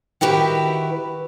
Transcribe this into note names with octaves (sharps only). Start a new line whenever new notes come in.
D#3 E4 F#4 G4 B4